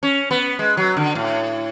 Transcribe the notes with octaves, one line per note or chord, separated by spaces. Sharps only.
C#4
B3
G#3
F#3
D3
A2